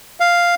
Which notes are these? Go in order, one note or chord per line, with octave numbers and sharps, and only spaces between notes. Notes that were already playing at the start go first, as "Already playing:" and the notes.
F5